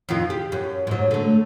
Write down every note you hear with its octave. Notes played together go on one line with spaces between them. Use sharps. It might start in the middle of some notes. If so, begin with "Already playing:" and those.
F2 D#3 F4
G4
F#2
G#2 F#3
D3 A3